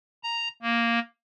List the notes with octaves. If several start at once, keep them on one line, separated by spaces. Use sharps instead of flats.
A#5
A#3